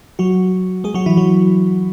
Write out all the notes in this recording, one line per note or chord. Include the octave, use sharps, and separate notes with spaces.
F#3 F#4
G#3 G#4
F#3 F#4
E3 E4
F#3 F#4